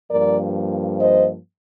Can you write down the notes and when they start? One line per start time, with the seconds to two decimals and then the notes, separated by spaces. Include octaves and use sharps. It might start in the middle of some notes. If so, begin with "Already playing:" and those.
0.11 G2 F3 A#3 A#4 D5
1.00 C5 D#5